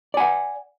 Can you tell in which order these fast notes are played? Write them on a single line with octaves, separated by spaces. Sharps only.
D5 G#5 F#5